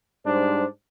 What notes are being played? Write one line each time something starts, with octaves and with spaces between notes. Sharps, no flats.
G#2 G3 D4 C5